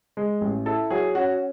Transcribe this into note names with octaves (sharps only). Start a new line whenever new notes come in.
G#3
A1
E4 A4
F#3 G#4
C#4 F#4